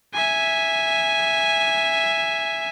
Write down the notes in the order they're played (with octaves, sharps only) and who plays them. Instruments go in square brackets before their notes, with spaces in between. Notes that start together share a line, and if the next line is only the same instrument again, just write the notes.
[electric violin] E5 G#5